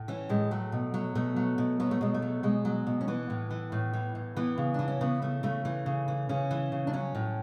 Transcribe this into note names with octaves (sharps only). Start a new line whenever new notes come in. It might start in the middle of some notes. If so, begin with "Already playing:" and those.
Already playing: A2
E3 C#4
A2 G#3
F#3 A3
B2
F#3
B2 A3
F#3
B2
F#3 B3
A3
B2 G#3
A3
F#3
B2 G#3
F#3
B2
C#4
E3 B3
A2
E3
A2
E3
A2
E3 B3
C#3
E3 D4
C#4
C#3 B3
E3 A3
C#3 A3
E3 A3
C#3
E3
C#3 C#4
E3
C#3
D4
F#3 C#4
A2